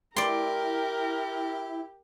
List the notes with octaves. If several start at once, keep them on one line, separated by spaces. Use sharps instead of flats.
E4 G4 A#4 D5 C6